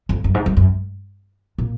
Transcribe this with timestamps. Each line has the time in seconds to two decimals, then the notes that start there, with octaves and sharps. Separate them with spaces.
0.09 F2
0.24 F#2
0.34 G#2
0.46 F#2
0.57 F#2
1.58 A#2